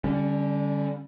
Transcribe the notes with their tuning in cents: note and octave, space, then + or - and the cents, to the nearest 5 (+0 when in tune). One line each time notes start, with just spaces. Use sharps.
D3 -20 G3 +10 C#4 +0